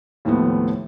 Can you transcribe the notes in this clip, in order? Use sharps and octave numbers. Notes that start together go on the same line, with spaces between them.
D#2 A2 F3 A3 B3